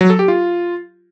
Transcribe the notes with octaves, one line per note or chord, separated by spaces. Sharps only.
F#3
A4
G4
F4